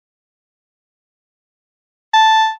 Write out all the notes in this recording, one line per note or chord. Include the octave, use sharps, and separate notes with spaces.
A5